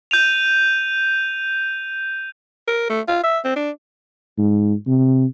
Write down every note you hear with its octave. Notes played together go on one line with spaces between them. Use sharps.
G6 D#7 F7
A#4
A3
F4
E5
C4
D4
G#2
C3